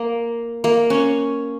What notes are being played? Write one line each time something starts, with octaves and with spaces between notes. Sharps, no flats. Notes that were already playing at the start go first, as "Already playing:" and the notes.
Already playing: A#3
A#3
C#4